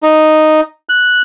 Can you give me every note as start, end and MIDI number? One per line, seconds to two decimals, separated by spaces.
0.03 0.61 63
0.89 1.22 90